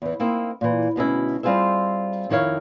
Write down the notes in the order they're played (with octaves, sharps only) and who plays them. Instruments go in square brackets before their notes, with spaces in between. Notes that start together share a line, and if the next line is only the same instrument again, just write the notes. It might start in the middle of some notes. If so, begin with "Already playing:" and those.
[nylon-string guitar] E2 E3
A#3 C4 D#4 E4
A#2 E3
D2 B2 C#4 E4
G3 C4 F4 G#4 C5 E5
F2 D#3 E4 C#5 F5